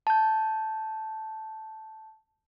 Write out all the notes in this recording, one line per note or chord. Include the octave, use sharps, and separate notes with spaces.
A5 G6